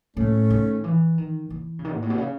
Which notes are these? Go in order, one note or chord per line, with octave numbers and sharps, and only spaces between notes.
A2 A3 C#4
D#3
E3
D#3
E3
C#3
D#3
G#2
A2
B2
C#3